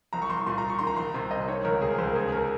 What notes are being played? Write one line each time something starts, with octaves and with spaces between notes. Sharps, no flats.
C2 A#5
C#6
C2 C6
C#6
A#2 C6
A#5
A#2
C#6
D#3 C6
A#5
C2 C6
C3 C6
C2 D#5
D#3 C#5
C#2 A#4
C3 G#4
A#4
C#2 C5
A#4
D#2 G#4
D#2 A#4